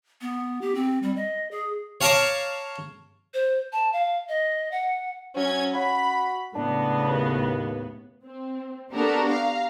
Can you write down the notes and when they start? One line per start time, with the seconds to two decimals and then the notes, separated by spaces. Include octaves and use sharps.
0.21 B3
0.61 G4
0.75 C4
1.03 G3
1.16 D#5
1.51 G#4
2.01 C#5 F5 A5 A#5 C#6 D6
3.34 C5
3.73 A5
3.93 F5
4.29 D#5
4.72 F#5
5.37 F#3 C#4 G#6
5.75 F#4 B5
6.55 A2 C#3 B3 D4
7.10 D#2
8.24 C4
8.92 B3 D4 F#4 G4 A4 A#4
9.29 F5 A#5